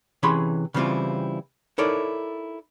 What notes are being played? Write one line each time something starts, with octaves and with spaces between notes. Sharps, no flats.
C3 E3 C#4 G#4 B5 C6
C#3 E3 G3 C4 E4 F4
D#4 E4 A4 A#4 C#5 D5